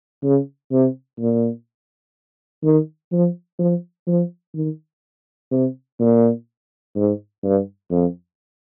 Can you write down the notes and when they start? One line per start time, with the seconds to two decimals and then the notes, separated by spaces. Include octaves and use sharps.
0.23 C#3
0.72 C3
1.19 A#2
2.63 D#3
3.12 F3
3.59 F3
4.07 F3
4.55 D#3
5.51 C3
6.00 A#2
6.96 G#2
7.44 G2
7.90 F2